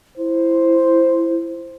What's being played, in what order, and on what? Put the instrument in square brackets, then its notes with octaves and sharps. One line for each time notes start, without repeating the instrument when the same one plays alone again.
[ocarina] E4 [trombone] C5